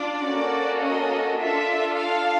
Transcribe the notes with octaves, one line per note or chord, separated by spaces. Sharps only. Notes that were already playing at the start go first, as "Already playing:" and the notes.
Already playing: D4 F4 D5
A#3 C#4 F#4 A4
D#5
D4 F4 A4 E5
F5